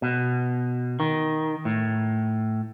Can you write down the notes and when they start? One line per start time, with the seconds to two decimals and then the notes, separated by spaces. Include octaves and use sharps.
0.02 B2
1.00 D#3
1.65 A2